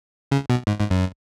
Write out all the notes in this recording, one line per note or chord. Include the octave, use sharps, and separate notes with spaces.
C#3
B2
G#2
G#2
F#2